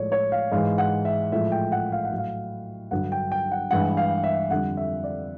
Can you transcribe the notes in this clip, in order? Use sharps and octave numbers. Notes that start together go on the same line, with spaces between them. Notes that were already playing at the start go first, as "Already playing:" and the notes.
Already playing: A2 F3 G#3 C#5 D5
C#5
F5
G#2 E3 G#3 F5
F#5
E5
A2 F3 G#3 E5
G5
F#5
F5
F#5
A2 F#3
F5
G2 D3 F#3 F#5
G5
G5
F#5
G2 E3 G#3 F#5
F5
E5
F2 D3 G3 F#5
E5
D5